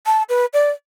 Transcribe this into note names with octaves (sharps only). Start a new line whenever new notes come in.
A5
B4
D5